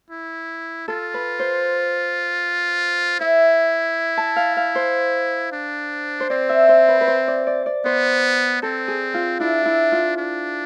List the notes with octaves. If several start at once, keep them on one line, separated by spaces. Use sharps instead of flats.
E4
F4 A4
B4
C5
E4 E5
A5
F5
F5
C5
D4
C5
C4 D5
E5
C5
B4
B4
C5
D5
D5
D5
B3 C5
C4 A4
G#4
F4
D4 E4
E4
F4
D4